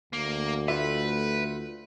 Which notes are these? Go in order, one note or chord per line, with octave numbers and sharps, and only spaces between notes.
D2 A#3
A3 F4 B4 E5